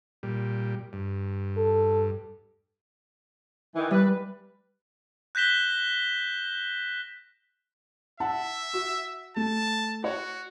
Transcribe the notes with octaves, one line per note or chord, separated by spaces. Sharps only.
A#2 G3
G2
A4
D#3 E3
G3 B4
F#6 G6 A#6 B6 E7 G7
E5 F#5 A5
F#4
A3 A5
F#4 C#5